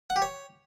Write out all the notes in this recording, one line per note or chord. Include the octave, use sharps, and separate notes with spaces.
F#5
G4
C#5